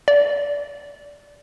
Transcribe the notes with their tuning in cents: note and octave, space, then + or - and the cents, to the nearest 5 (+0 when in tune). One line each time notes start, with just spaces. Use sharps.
D5 -20